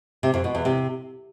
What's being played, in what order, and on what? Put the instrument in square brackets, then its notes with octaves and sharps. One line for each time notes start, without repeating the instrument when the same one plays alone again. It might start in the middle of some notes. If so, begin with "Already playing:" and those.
[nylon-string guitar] C3
F2
B2
E2
C3